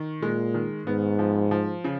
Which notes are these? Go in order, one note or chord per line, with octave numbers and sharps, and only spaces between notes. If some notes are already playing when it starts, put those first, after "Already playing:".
Already playing: D#3
A#2 G#3
D#3
G#2 B3
F3
F3
C#3